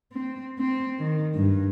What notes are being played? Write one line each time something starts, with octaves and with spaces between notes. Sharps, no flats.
C4
C4
D#3
G2